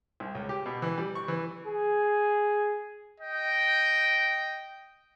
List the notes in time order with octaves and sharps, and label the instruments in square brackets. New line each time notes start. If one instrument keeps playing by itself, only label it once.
[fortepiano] C2
C#2
G4
B2
E3
G3
C#6
E3
[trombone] G#4
[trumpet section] D#5 G5